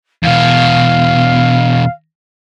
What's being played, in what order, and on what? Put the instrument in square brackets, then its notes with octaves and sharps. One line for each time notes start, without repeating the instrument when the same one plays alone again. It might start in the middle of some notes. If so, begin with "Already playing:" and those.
[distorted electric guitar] E2 B2 [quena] F5